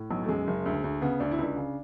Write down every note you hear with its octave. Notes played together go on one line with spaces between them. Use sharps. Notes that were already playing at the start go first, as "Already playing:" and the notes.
Already playing: A2
B1 F#3
A3
F#2 G#3
F#1
D2
D2
C#3 B3
D2 D4
E4
C#2 D4
C#3